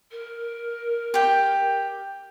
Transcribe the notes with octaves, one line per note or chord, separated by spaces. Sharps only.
A#4
G4 G5